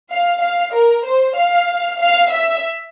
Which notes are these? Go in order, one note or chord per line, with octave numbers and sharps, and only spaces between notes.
F5
F5
A#4
C5
F5
F5
E5